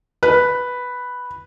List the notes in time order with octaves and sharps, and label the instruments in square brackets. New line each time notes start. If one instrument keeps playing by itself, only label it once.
[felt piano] B4